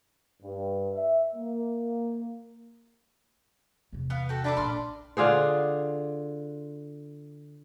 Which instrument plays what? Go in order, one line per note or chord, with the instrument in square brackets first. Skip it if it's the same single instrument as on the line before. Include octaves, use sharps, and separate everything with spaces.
[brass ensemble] G2
E5
A#3
[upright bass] E2 C3
[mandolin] B3 F5
F#4 A4 G5
[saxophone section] D4 [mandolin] A4 B4 E5
[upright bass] A#1 [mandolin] B5 C6 F6
[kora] D3 F4 G#4 C5